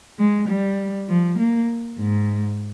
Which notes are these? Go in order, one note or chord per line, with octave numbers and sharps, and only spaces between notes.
G#3
G3
F3
A#3
G#2